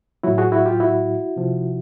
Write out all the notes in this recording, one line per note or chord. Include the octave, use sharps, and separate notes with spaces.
A2 F#3 E4 F#4
F#4 G#4
E4 F#4
F4 G4
E4 F#4
C3 F3